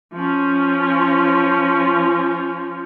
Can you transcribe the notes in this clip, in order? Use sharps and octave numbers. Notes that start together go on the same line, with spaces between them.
F3 C#4